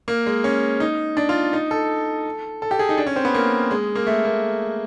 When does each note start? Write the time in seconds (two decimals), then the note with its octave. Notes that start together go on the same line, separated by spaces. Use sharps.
0.08 A#3
0.26 G#3
0.44 C#4
0.80 D#4
1.17 D4
1.29 F4
1.53 D#4
1.71 A4
2.62 A4
2.71 G4
2.79 G#4
2.89 D#4
2.98 D4
3.07 C#4
3.16 C4
3.25 B3
3.34 A#3
3.71 G#3
3.95 A#3
4.07 A3
4.25 A#3